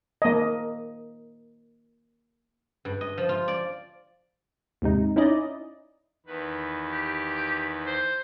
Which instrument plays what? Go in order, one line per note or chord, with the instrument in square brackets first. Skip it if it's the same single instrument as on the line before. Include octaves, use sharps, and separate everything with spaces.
[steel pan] A#3 D#5
[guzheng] G2
D#5
F3
F4
D5
[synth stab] D#2 G#2 C3 D#4
C#4 D#4 E4 D5 D#5
[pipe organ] E2 D#3 B4
[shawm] G4
C5